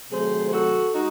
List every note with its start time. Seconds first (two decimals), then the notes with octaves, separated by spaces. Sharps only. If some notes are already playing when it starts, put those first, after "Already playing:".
0.10 C3 D#3 F#3 A3 G#4 C5
0.45 C5
0.51 F#4 A4
0.93 G#3 D#4 F#4